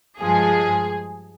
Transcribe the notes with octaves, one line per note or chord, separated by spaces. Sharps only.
G2 F3 G#3 G#4